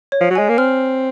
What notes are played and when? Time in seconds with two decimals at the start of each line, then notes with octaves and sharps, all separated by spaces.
0.12 C#5
0.21 F3
0.30 F#3
0.35 G#3 G#5
0.49 A#3
0.58 C4 F6